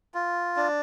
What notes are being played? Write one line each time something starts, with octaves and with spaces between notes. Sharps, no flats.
F4
D4